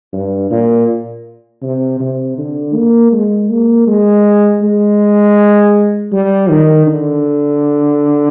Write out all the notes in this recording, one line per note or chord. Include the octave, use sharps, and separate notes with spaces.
G2
A#2
C3
C3
D3
A#3
G#3
A#3
G#3
G#3
G3
D#3
D3